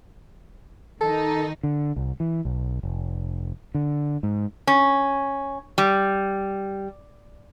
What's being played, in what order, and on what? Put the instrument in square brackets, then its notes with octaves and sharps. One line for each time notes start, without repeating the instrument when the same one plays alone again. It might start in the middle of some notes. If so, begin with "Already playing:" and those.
[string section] D#3 D#4 [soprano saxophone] A4
[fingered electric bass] D3
C2
E3
B1
F1
D3
G#2
[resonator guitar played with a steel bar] C#4
G3